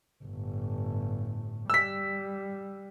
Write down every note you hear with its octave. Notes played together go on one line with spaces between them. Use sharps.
G1 A2
G3 E6 B6